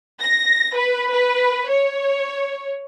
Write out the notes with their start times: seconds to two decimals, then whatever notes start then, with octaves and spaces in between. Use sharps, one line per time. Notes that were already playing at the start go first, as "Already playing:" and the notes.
0.20 A#6
0.76 B4
1.10 B4
1.69 C#5